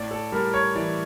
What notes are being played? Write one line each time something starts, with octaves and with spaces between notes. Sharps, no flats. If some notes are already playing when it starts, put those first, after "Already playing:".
Already playing: A2 D5
A4
G3 A#4
C#5
E3 D5